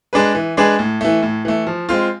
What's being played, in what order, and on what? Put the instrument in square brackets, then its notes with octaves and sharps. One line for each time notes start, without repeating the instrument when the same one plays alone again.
[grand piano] G#3 D4 G#4 B4
E3
G#3 D4 G#4 B4
A2
E3 A3
A2
E3 A3
F3
G#3 C4 F4